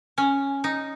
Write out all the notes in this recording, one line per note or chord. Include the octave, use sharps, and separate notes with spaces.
C#4
D#4